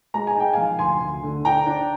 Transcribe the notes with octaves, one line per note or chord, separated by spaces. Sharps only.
G#3 A#5
G#5
D#4 G5
F3 F5 G#5
D2 G#5 C6
D2
D3
D4 G5 A#5
D4